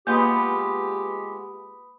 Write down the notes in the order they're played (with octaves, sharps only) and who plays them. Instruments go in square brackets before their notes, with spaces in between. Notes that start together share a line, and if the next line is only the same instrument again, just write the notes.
[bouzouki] G#3 B3 F4 [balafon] A#3 [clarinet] G4 [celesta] B4 B5 D#6